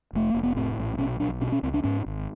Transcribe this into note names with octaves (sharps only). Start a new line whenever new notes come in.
F1 A3
F1 A#3
B3
A2 C4
A#1
B2 C#4
B1 D4
B2 C#4
D4
C#4
C#2 C4
D4
G#2 C#4
G#1